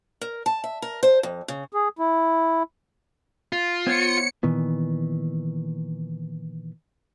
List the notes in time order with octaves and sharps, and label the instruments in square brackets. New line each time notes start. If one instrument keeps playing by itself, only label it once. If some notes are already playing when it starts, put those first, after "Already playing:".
[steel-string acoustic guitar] A#4
A5
E5
A#4
C5
F2
C#3
[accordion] G#4
E4
[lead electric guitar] F4
[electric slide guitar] B3 C5 C#5 [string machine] C#7
[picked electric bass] A#2 D#3 E3 B3